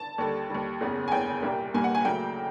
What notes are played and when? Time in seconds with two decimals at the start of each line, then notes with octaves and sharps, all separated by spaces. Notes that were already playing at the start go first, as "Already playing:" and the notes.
Already playing: A5
0.18 D#2 D3 G3
0.50 D#2 D3 G3
0.81 F#1 E2 C#3
1.08 G#5
1.11 F#1 E2 C#3 G5
1.42 C2 A#2 G3 A#3
1.74 C2 A#2 G3 A#3 G#5
1.84 F#5
1.95 G#5
2.05 D2 C#3 F#3 A#3 G5